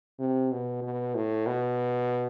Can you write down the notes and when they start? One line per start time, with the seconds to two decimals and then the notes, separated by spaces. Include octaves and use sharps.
0.19 C3
0.51 B2
0.83 B2
1.15 A2
1.47 B2